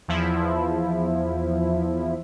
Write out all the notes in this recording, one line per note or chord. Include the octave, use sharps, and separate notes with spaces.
E2 F3 E4